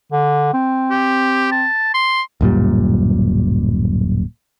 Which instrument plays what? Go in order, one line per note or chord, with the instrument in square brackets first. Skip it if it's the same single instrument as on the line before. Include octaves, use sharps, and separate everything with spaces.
[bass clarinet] D3
C4
[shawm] G4
A5
C6
[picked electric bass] D1 F#2 A#2 G3